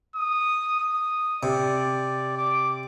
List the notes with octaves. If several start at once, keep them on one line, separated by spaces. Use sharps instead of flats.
D#6
D#6
C3 D5
D6